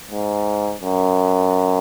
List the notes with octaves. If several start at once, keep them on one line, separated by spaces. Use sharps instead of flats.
G#2
F#2